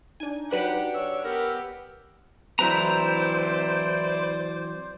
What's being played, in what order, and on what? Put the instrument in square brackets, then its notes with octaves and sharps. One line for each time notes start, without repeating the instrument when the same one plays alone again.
[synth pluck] D4 G#5 [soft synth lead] D#4
[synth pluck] F#3 B4 F#6 [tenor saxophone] D4 [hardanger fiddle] G4 F#5
[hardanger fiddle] C#5 [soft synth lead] E6
[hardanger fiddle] B3 G4 [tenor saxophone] A#4
[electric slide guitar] E3 F#3 C4 [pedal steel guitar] E4 B4 A#5 [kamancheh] C5 D5